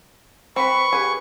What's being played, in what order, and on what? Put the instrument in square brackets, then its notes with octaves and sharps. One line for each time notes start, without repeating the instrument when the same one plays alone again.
[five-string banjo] C4 B4 [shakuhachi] B5 [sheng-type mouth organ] C#6
[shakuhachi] G4 [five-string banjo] G#4 B4